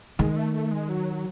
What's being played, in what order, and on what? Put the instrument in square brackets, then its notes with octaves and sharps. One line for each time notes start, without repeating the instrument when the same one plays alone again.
[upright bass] D#3 [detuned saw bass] G#3
[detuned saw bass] A3
A3
G#3
F#3